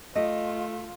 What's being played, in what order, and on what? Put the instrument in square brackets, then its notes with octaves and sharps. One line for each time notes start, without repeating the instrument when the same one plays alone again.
[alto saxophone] A3 [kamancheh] F4 [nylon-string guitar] D#5